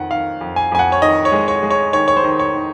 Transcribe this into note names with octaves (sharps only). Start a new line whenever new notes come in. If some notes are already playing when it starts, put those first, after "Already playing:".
Already playing: F2 D#3 F#5
D#3 F5
F2
G#5
F2 G#5
F#5
C#5
D#3 D#5
C#5
G#3
C#5
G#3
C#5
D#3 C#5
C#5
C5
D#3
C#5
D#3